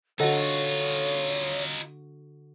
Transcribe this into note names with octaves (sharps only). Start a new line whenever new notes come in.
D3 D#4 F4 F#4 A4 C#5 D#5 F#5